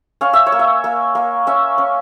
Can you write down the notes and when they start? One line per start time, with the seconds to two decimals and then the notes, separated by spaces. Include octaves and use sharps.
0.21 C#4 F5
0.33 E5
0.47 C#5
0.52 A#3
0.59 E5
0.84 A#3
1.15 A#3
1.47 C#4 E5
1.78 C#4